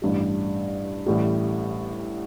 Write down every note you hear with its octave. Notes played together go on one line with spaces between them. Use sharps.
A1 G2 G3
A1 A2 G3